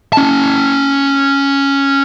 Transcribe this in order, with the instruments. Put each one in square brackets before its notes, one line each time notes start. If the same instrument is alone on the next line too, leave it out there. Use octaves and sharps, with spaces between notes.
[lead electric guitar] C#4 A5